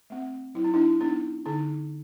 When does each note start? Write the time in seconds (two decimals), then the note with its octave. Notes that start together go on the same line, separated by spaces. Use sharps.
0.10 A3 C4
0.54 F#3 E4
0.64 D#4
0.74 D4 E4
1.00 B3 D4 D#4
1.46 D3 D#4